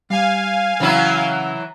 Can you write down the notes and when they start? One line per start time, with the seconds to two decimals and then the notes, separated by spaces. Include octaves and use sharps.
0.10 G3 F5 G#5
0.80 C#3 E3 F#3 E4 B5